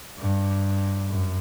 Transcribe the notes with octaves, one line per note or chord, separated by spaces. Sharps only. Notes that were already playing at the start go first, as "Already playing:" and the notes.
G2
F#2